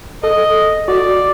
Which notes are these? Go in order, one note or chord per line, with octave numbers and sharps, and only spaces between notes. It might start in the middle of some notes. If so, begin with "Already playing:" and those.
A4 D#5
F#4 D5